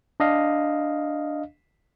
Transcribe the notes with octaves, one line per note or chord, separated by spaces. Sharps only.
D4 D#5 F5